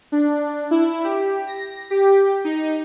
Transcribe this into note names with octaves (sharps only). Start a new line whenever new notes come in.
D4
E4
G4
A#6
G4
D#4